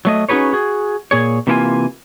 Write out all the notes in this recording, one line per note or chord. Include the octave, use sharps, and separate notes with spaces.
F#3 A3 D#5
C#4 D#4 F#4 G#4 B4 C#5
F#4 G#4
A#2 G#4 C#5
C3 E3 A#3 E4 F4 G#5